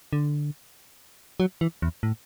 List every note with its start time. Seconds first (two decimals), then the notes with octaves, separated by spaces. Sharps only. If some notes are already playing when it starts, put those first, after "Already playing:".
0.13 D3
1.40 F#3
1.61 E3
1.82 E2
2.03 A2